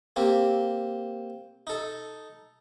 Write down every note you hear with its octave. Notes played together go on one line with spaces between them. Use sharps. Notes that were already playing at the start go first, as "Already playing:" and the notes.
A#3 C4 G4
D#4 A4